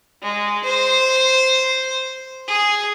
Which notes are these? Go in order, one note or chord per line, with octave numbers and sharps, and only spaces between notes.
G#3
C5
G#4